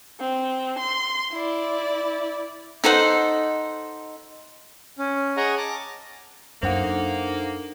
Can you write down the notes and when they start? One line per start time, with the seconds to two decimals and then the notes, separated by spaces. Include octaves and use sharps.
0.20 C4
0.79 C6
1.32 E4 D5
2.84 D#4 A4 C5 F#5
4.98 C#4
5.37 G#4 C#5 D#5 F#5 G#5 A#5
5.58 A5 A#5 D6
6.63 F#2 A#3 D4 D#4 A4 C5 F#5